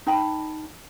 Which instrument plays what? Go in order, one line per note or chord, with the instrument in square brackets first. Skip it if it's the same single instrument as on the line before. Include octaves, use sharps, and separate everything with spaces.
[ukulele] D#4 G5 A5 B5